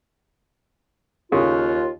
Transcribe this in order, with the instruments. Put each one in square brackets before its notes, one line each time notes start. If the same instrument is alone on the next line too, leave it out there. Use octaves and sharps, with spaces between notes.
[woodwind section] D#2 F4 [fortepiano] C#3